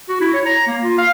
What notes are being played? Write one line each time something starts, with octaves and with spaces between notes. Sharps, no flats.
F#4
E4
C#5
A#5
A#3
F4
F5